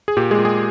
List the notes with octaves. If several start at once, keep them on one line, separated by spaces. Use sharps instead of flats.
G#4
A#2 G4
G#3 G#4
A#2
G#3 G#4